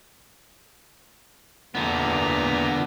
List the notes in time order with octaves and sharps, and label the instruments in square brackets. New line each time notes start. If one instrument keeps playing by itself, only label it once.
[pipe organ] E2 A#2 A#5 [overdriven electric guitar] D3 B3